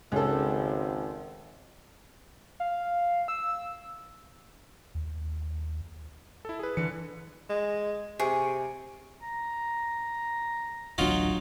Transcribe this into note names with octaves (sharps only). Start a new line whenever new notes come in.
G#1 C#2 A4
F5
E6
D#2
E4 A4
G#4 B4
D3 E3 B4 C#7
G#3
C3 G#4 C#6
A#5
D1 A1 F#3 D4 D#4 F4